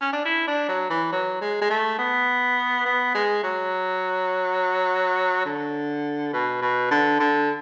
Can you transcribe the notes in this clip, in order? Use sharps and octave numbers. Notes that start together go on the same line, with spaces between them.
C#4
D4
E4
D4
F#3
E3
F#3
G#3
G#3
A3
B3
B3
G#3
F#3
D3
B2
B2
D3
D3